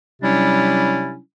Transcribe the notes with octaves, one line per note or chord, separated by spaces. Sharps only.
C3 F#3 G3 C#4 D4 E4